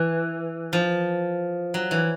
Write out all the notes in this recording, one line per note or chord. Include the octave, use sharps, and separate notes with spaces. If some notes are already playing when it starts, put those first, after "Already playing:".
Already playing: E3
F3
F#3
E3